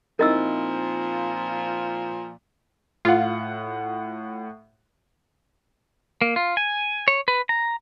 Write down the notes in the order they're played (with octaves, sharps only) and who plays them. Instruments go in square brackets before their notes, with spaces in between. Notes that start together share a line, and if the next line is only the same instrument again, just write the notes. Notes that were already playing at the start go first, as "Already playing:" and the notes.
[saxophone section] A#2 F3 [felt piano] C4 D#4 E4 [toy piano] A#4 D#5 E6
[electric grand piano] A2 F#5 [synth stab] F4
[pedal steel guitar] A#3
F4
G#5
C#5
B4
A#5